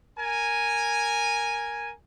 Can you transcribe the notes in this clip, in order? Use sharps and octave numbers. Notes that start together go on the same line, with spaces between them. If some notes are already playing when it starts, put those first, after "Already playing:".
A#4 G#5